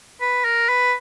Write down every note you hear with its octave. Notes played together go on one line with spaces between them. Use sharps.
B4
A#4
B4